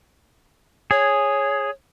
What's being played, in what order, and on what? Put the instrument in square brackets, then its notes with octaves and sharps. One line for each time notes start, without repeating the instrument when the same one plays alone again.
[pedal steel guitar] G#4 [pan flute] C#5